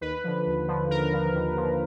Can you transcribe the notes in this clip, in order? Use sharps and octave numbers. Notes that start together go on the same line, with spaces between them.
D#2 B4
D3 F3
D#2
D3 F3
D#2 A#4
D3 F3
D#2
D3 F3